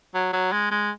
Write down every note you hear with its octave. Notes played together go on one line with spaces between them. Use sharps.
F#3
F#3
G#3
G#3